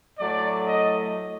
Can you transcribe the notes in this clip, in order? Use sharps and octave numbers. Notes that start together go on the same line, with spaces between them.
A2 F#3 A3 D5
D#5